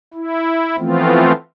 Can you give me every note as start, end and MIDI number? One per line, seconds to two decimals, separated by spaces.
0.14 0.76 64
0.78 1.32 52
0.78 1.32 53
0.78 1.32 57
0.78 1.32 59
0.78 1.32 60
0.78 1.32 65